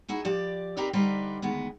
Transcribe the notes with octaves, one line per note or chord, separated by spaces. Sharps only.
D#4 E4 F#4 G#4
F3 G4 D5
C4 D#4 G4 A#4 B4 D5
D3 G3 D#4 B4 C5 D5
D2 D#3 G#3 B3